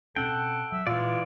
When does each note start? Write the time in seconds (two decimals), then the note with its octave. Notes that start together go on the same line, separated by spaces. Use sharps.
0.16 B2 C4 C#4 A4 F#5 G5
0.72 F#3 E5
0.87 A#2 E3 G#3 F4 D5